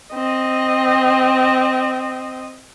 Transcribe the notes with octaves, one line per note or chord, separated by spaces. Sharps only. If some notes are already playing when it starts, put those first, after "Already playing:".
C4 D#5